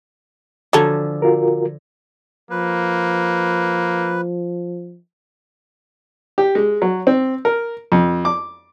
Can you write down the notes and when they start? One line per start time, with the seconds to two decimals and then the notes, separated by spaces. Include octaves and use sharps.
0.73 D3 F3 F#3 A4 G#5
1.22 F4 F#4 A#4
2.51 F3 A#3 B4
6.38 G4
6.55 G#3
6.82 F#3
7.07 C4
7.45 A#4
7.92 F2
8.25 D6